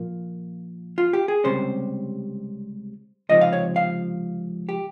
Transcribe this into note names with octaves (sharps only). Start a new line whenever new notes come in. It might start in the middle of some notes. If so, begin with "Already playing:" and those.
Already playing: A#2 F3 A#3
F4
G4
G#4
C#2 C3 G3 C#4 C5
C#2 C3 F3 C4 D#4 D#5
F5
C#5
F5
G4